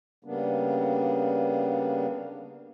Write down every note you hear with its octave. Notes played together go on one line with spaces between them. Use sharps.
C#3 G3 A#3 B3 D4